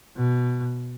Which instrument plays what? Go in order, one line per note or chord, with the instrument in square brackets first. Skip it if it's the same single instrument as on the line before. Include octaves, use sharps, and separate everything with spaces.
[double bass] B2